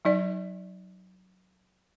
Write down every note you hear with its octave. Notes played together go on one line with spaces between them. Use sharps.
F#3 D#4 D5